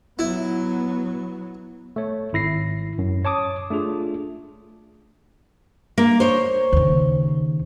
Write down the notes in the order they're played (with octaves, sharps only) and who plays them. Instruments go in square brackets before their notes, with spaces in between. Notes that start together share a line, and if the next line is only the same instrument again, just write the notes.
[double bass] F#3 B3 [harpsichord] E4
[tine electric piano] A3 C#5
G#1 E4 A#6 C7
F#2
C#5 A5 D6 D#6
A3 D4 F4 G#4
[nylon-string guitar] A#3
C5 C#5
[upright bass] D#2 C#3